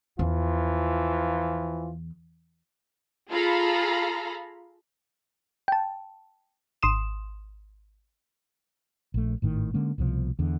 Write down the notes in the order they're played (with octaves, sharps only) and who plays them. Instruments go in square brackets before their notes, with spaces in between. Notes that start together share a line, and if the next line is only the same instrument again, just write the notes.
[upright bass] E2 [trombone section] E3 F3 F4
[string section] F4 G#4 A4 F5 A#5 B5
[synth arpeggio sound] G5 A5
G#1 C6 D#6 E7
[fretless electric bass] A#1 A3
G#1 A2 D#3
D3 G#3 A#3 C#4
C2 B2 D#3 F3
E2 D3